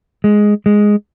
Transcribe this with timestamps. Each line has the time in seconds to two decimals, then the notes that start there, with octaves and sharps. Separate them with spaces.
0.24 G#3
0.66 G#3